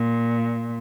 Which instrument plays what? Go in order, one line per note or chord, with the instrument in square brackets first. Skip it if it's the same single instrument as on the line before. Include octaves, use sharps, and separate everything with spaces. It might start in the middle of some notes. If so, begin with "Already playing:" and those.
Already playing: [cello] A#2